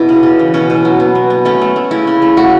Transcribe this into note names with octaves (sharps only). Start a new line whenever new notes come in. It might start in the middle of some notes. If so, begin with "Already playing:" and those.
Already playing: B2 E4
C#3
C#3
E3
B2 C#4
B2
F#3
B3
B3
B3
A3 C#4
A3
A3
C#3 E4
C#3
A3
A3 F#4